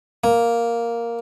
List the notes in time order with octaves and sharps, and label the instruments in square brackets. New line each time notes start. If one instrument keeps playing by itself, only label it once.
[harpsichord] A#3